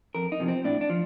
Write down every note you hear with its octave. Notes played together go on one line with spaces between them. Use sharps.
F2 A#4
D#4
C3 F3
C4
A2 D4
D4
F3